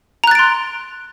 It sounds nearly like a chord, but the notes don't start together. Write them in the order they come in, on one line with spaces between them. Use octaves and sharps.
A#5 F#6 A6 D7 C6